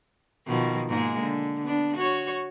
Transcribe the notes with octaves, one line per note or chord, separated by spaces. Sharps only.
B2 D#3 F3
G#2 G#3 A#3
D3
B3 D4
F#4 C#5